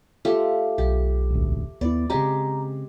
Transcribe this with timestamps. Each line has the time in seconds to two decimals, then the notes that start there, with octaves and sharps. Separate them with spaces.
0.25 A3 F4 G4
0.78 B1 G4
1.30 E1 A1 D2
1.81 D#2 B3 E4 D5
2.10 C#3 G#3 C4 G4 A#5